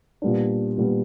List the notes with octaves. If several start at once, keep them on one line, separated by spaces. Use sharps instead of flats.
A#2 G3 B3 D4
A#2 G3 B3 D4